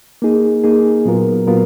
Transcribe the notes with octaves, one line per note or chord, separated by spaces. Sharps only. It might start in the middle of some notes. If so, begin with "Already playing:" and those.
A#3 D#4 G#4
A#3 D#4 G#4
A#2 F#3 B3 F4 A#4
A#2 F#3 B3 F4 A#4